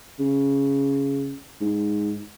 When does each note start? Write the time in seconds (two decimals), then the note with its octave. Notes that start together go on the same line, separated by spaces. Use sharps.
0.19 C#3
1.61 G#2